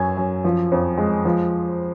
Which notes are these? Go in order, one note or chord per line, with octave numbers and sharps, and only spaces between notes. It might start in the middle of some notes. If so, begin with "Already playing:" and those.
Already playing: F#2 F#3 G#5
F#2
F3
F2
G#3
F3